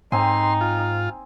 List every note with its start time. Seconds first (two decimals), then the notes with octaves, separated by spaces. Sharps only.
0.12 G#2 C4 D#4 G#5 C6
0.61 F4